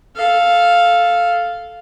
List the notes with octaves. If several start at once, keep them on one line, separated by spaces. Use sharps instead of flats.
A4 F5